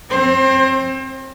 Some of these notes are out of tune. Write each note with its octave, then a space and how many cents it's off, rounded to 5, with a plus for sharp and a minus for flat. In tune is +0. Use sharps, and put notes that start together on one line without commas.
C4 +15 C5 +35